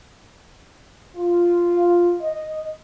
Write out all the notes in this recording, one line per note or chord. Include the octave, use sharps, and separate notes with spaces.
F4
D#5